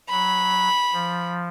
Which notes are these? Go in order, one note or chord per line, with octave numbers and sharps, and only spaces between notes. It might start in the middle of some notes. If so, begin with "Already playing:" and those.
F#3 B5
F3